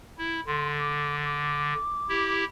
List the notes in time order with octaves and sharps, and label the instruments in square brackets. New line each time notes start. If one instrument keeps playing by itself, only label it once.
[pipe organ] E4
[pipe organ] D3 [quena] C6
[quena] D6
D6
[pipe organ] E4 G4